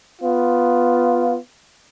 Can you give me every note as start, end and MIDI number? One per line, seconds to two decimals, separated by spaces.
0.22 1.35 59
0.22 1.35 65